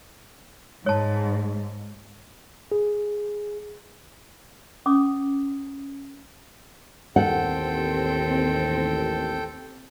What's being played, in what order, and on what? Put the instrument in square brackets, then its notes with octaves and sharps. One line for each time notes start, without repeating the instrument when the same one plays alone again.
[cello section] G#2 [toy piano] C#5 A5
[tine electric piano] G#4
[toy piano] C#4 D6 D#6
[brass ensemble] A1 D#2 [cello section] C4 [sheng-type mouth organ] A4 G5 [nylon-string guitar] F#5